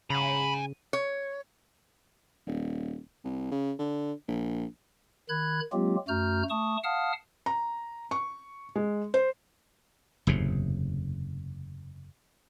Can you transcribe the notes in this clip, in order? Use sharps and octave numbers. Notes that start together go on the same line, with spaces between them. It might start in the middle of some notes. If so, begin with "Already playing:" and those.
C#3 G#5 A#5 B5
C#5
D#1
C2
C#3
D3
A#1
D#3 B5 F#6 G#6
F#3 G#3 A#3 C4 F4 G4
F#2 A3 F#4 A#5 F6 G6
A3 A5 C#6 D#6
F5 F#5 A5 D#6 F6
A#5
C#6
G#3
C5
F#1 E2 A2 C3